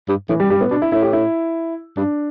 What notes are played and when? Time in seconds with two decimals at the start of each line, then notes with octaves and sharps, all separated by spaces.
0.08 G2
0.29 A2 E3
0.40 G3
0.50 G2 G3
0.60 A2 B3
0.70 B2 D4
0.82 E4
0.92 A2 E4
1.02 G4
1.13 E4
1.97 G2 D4